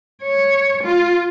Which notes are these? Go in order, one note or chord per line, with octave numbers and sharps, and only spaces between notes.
C#5
F4